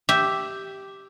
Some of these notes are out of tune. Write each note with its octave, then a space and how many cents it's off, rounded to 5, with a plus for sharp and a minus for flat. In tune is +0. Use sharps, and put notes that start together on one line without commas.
G4 -5 E5 +0